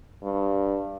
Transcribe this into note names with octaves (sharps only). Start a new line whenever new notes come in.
G2